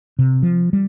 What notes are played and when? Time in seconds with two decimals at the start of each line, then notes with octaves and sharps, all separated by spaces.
0.19 C3
0.43 F3
0.73 G3